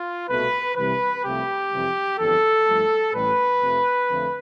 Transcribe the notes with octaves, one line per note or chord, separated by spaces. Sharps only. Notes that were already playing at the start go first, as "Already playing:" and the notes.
Already playing: F4
C2 B2 A3 B4
C2 C3 E3 B4
C2 C3 F3 A3 G4
F2 C3 E3 G3
G1 F2 E3 G3 A4
G2 F3 A3
A1 A2 G3 B4
F2 C3 F3 A3
F2 D3 F3 A3